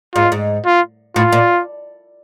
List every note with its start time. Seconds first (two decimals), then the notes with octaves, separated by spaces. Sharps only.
0.15 G#2 F4
0.32 G#2
0.66 F4
1.16 A2 F4
1.32 A#2